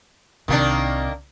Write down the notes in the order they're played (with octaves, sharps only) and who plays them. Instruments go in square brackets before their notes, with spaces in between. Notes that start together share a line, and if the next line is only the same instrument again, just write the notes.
[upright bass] C2 C3 [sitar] D#3 A#3 D4